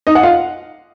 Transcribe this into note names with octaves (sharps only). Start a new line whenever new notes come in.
D#4 D#5
F#5
F4 F5